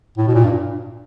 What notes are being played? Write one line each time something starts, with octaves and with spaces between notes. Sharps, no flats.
A2
B2
A#2
G2